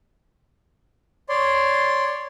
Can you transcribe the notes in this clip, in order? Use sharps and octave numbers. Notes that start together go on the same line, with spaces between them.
C#5 D5 C6